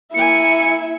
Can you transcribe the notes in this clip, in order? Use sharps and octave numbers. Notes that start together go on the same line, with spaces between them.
A#3 E4 E5 G#5 C#7